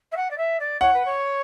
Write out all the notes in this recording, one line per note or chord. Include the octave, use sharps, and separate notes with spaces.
E5
F#5
D5
E5
D5
C#5 F#5
B4
C#5